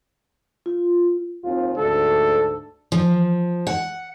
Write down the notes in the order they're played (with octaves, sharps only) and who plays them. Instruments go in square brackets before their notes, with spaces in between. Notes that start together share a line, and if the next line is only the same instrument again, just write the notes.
[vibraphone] F4
[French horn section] D#2 C4 F4
[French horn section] D2 G#2 D4 [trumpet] A4
[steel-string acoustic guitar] F3
F#5